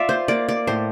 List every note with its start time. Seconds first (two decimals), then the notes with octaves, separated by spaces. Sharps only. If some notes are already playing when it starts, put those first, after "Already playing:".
Already playing: F4 D5 E5
0.09 C5
0.28 A#3 D5
0.49 D5
0.67 A2 C5